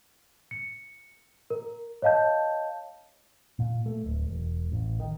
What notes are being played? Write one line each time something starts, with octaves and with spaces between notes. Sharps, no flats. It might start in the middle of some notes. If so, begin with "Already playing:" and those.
C#7
A#4
C#5 D#5 F5 A5 G6
A#2
A3
D1
E1
A1
D#3